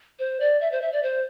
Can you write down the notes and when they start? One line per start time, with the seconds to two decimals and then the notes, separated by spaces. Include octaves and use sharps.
0.19 C5
0.40 D5
0.61 E5
0.72 C5
0.82 E5
0.93 D5
1.03 C5